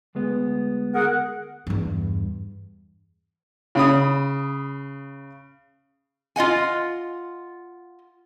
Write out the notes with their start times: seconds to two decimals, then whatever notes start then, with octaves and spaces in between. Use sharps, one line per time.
0.15 D2 G#3 B3
0.94 G#4 A#4 F#5
1.67 E2 G2
3.75 C#3 B5 D#6
6.36 F4 D#5 F#5 G#5